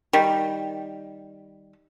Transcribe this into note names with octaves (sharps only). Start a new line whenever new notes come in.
D#3 G3